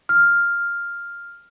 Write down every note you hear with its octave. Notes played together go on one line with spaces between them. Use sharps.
F6